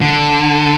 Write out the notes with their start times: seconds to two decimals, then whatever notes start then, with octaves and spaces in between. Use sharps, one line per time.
0.01 D3